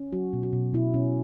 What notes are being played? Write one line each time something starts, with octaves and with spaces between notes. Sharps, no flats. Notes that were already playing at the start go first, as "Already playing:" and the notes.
Already playing: C#4
F#3 F#4
B2
F#4
B2
B2 E4
B2 C#4